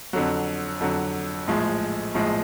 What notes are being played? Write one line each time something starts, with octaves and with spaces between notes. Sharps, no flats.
F2 D3 F#3
F2 D3 F#3
A#1 A2 F3 G#3
A#1 A2 F3 G#3